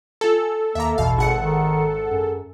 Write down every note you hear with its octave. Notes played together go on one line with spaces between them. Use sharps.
F4 A4 G#5
D#2 A#3 E5 A#5
A1 E2 B2 F5
G#1 G#4 F#5 C#7
D#3
F#2